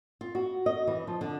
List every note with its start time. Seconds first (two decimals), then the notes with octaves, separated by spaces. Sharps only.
0.21 F4
0.35 F#4
0.66 D#5
0.87 E3
1.07 F3
1.21 D3